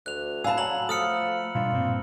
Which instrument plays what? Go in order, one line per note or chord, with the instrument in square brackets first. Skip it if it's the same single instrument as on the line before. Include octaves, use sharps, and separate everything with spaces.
[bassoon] D2 [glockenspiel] F#6 F7
[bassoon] D4 [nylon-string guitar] F5 A5 [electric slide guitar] G#5 [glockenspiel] B5 E6
[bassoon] F#3 [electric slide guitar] C#5 [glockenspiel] A#5 F#7
[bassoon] F3 [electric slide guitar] A3 A4 [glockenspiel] D#6 F6 C#7
[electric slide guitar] B2 G3 D4 [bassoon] F4
[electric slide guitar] G2 A#2 C4